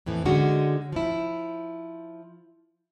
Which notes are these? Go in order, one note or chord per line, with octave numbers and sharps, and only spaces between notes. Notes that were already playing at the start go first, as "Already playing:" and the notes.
F2 A2 E3
D3 G#3 C#4 D#4 F#4
F3 E4